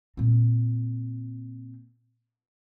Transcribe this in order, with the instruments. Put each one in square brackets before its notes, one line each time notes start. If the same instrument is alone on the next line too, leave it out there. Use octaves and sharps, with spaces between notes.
[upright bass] A#2 C4